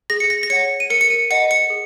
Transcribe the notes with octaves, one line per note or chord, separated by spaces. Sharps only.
G#4 A#6
C#7
A#6
A#6
C#5 F#5 C#7
D#7
A#4 C#7
C#7
D#7
D#5 F#5 C#7
C#7
G#4